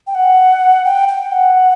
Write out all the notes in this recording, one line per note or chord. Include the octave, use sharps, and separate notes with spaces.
G5
F#5
G5
G5
F#5